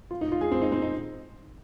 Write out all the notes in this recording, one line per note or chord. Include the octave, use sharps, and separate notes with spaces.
F4
D#4
F4
G#4
C4
D#4
C4
D#4